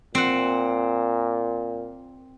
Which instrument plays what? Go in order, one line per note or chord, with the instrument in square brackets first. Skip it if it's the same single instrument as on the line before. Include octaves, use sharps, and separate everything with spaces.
[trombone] A#2 [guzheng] C4 F#5